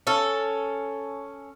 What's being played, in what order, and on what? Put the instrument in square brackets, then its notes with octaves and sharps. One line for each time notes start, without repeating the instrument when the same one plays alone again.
[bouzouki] C#4 A4